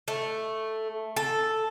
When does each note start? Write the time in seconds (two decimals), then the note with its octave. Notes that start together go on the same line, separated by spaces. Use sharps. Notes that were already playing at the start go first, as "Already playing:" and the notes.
0.08 A3
1.16 A4